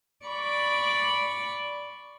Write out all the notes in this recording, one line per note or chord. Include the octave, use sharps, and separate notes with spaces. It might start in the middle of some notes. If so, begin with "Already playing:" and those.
D5 B5 C#6 D6